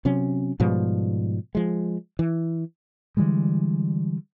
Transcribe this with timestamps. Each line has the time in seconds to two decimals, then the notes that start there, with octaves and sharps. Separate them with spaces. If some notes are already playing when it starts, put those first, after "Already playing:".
0.05 C3 F#3 C#4
0.60 G#2 B2 F3 G3
1.55 F3 G#3
2.19 E3
3.17 D3 E3 G3 G#3